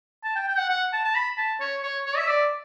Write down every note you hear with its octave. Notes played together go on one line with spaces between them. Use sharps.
A5
G5
G5
F#5
F#5
A5
A5
B5
A5
C#5
C#5
C#5
E5
D5